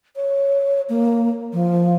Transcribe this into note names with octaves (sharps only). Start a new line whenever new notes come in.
C#5
A#3
F3